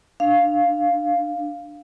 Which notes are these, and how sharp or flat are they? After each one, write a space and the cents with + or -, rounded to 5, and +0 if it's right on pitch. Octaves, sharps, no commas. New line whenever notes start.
D4 +10 F5 +0